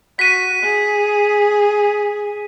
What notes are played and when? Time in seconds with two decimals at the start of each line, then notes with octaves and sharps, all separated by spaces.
0.19 F#4 B6 D#7
0.63 G#4